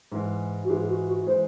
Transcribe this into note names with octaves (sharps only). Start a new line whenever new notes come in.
G#2 E3 G#3
F#4
G#2 E3 G#3 G#4
F#4
F#4
E3 G#3 C5